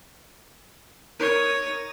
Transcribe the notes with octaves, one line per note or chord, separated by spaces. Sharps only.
D#4 A#4 C#5 D#7